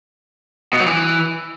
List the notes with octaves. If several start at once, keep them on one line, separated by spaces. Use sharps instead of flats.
B2
F#3
E3